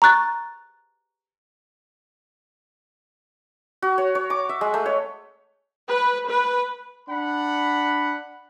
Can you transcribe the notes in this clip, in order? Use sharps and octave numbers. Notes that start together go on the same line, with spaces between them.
A#5 C#6 F#6 A6
F#4
C#5
C#5
D6
E5
G#3
A3
C#5
B4
B4
D4 F#5 B5